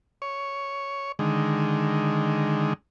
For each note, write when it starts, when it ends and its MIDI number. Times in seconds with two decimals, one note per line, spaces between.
0.22 1.12 73
1.19 2.73 50
1.19 2.73 51
1.19 2.73 56